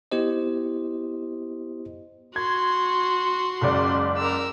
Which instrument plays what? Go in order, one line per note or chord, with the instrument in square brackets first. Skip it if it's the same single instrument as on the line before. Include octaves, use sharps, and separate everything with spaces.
[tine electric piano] B3 E4 G4 C5 D#5
[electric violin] F#4 C6 [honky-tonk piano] G#6
[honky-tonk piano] F#1 C#2 D5
[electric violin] A#4 E6